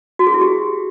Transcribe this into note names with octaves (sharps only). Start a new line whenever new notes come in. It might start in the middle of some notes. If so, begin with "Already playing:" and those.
F#4
G#4
E4
G4